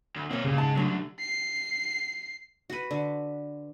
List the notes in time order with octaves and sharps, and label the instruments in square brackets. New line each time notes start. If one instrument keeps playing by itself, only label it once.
[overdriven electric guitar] D2
[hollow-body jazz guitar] B2 A#3 [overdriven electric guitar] C4 C#5
[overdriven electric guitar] G2 A#2 [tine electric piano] C#3
[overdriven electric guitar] G#2 G#3 [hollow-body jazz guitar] A5
[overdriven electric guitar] C2 D3 [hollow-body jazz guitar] F#3 A3 D4
[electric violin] C7
[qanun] F#4 B4
D3